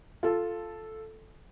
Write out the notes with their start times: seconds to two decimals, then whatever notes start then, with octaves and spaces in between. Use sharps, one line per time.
0.23 F4 A4